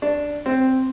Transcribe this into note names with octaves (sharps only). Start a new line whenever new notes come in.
D4
C4